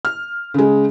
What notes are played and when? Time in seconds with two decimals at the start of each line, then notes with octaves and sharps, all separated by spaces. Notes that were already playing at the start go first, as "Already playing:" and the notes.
0.05 F6
0.54 C#3 G#3